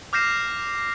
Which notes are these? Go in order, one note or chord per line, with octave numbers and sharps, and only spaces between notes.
D6 F6 G6 A#6 C7 E7